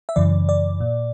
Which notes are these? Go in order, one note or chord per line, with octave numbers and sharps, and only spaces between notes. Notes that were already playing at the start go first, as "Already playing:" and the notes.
E5
F#2 C#3 E3 D5
D5
A#2